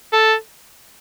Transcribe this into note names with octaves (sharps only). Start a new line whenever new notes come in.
A4